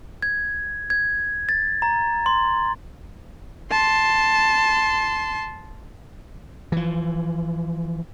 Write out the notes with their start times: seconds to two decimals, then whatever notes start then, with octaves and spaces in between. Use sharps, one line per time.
0.22 G#6
0.90 G#6
1.49 A6
1.82 A#5
2.26 C6
3.71 A5 C6
6.72 E3 F3